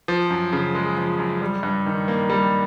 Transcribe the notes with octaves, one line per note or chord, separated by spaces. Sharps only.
F3
F#2
C#3
G#3
F3
F#2
G3
G2
D#3
A#3
G3